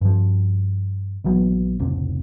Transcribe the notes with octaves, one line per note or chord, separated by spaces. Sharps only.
G2 F3
A#1 E3 F#3 B3
F1 C#2 A2 C3